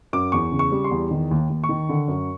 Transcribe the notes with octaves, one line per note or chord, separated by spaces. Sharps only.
F#2 D6
E2 C#6
C#3
C#6
G3
C6
E2
D#3
D#2
D#2
C#6
D#3
D3
F#2